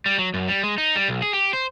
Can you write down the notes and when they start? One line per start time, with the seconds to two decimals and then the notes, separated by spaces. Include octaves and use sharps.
0.06 G3
0.18 F#3
0.34 F#2
0.48 G3
0.63 G#3
0.78 D#4
0.95 G3
1.08 B1
1.22 G#4
1.33 G4
1.53 C5